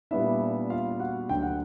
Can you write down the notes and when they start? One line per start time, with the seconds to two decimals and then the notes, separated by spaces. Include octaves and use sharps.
0.11 A#2 G3 B3 D4 E4 E5
0.70 F4 F5
1.00 F#4 F#5
1.29 D2 D3 F#3 G5
1.43 F#5